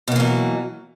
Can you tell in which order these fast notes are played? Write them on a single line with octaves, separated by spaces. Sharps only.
B2 A#3 E3 F#3